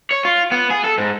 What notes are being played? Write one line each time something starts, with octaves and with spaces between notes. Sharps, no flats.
C#5
F4
B3
G#4
A4
G#2